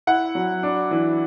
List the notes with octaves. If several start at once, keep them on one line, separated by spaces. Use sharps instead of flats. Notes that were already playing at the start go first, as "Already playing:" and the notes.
E4 F#5
F#3
D4
E3